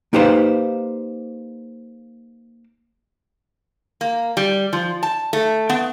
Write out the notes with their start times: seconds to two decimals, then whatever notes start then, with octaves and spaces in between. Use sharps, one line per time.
0.13 A#3 D#4 G4 B4 C5 F5
4.01 A#3
4.37 G3
4.73 F3
5.03 A5
5.33 A3
5.70 B3